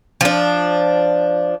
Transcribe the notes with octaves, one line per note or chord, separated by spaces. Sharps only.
F3 D4